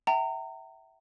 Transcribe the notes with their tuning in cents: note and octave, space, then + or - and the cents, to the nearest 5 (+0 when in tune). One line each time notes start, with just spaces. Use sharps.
E5 +0 G5 -45 A#5 -30